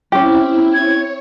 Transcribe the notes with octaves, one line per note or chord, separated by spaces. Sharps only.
C4 C#4 E4 G4
C#5 G#6